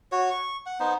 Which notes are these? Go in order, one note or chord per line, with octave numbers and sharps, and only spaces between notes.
F#4 C#5
C#6
F#5
B3 D#4 C5